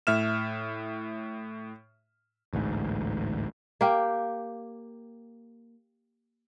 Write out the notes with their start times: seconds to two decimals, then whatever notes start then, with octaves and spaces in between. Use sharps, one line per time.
0.07 A2 E5 F6 E7
2.53 A1 D2 G#2
3.81 A#3 G4